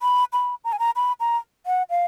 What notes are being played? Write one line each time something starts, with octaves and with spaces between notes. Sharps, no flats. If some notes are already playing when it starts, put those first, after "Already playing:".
B5
B5
A#5
G#5
A#5
B5
A#5
F#5
F5